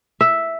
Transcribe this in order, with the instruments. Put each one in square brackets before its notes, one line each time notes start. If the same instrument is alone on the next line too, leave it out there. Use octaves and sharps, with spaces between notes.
[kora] E5